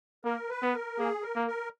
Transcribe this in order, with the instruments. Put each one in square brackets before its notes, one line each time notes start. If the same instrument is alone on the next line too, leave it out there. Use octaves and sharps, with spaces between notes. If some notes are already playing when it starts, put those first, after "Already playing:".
[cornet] A#3 [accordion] A#4
[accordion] B4
[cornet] B3
[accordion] A#4
[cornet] A#3 [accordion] G#4
[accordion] A#4
[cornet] A#3
[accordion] A#4